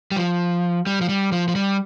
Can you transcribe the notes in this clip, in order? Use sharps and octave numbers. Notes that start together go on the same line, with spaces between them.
G3
F3
G3
F3
G3
F3
F3
G3